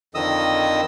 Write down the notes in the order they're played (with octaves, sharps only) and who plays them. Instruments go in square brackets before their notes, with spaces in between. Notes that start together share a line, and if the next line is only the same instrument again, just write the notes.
[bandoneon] F2 D3 D#3 D#5 D#6 E6